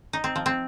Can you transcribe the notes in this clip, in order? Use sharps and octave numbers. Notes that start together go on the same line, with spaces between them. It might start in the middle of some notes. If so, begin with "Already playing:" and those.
D#4
C4
F3
C4